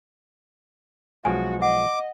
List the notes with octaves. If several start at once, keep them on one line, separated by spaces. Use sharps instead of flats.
B1 F3 G#3 F#4 G#5
D#5 F#5 D6